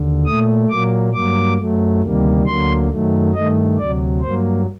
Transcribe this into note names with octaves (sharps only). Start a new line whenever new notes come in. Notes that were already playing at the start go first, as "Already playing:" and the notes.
Already playing: D#2 D3
A#2 A3 D#6
A#2 F#3 A#3 D6
G2 F#3 A#3 D6
F#2 F#3 A3
D2 C3 D#3 G3 A#3
D2 D3 F#3 A#3 C6
F#2 D#3 F#3 A3
G2 D#3 A3 D#5
D2 C3 F#3 D5
G2 F#3 A#3 C5